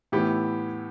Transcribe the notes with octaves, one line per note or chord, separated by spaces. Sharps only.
A2 E3 B3 E4 G4